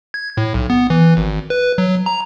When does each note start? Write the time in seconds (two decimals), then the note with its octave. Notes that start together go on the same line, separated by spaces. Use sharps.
0.14 G#6
0.37 A2
0.54 B1
0.70 B3
0.90 E3
1.17 G#1
1.50 B4
1.78 F#3
2.06 A#5